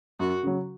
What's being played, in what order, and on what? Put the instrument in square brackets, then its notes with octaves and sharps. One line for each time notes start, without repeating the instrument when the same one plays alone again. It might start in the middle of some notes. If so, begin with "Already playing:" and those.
[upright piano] F#2 [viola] F#4
[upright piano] C#3 F#3